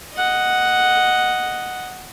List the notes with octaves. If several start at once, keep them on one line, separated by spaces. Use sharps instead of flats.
D#5 F#5